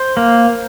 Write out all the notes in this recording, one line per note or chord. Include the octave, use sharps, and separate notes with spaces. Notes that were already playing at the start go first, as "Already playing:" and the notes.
Already playing: C5
A#3